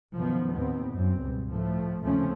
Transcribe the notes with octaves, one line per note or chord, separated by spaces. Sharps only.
B1 F#2 D#3 F3 B3
D#2 A2 B3 C4
F#2 C4
C#2 G2 B2
A2 F3 A3
D#2 C#3 F3 A3 C4 C#4